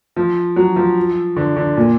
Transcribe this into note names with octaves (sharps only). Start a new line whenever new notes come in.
F3
F#3
F3
D3
D3
A#2